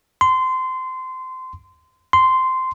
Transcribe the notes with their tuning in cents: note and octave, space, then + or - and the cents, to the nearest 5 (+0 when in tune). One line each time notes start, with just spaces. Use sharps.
C6 -20
C6 -10